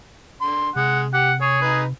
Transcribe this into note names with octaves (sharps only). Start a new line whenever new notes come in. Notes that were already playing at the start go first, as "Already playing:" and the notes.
D3 C6
C3 G#3 F#5
G4 F#5
G#4 C#5
D#4 B4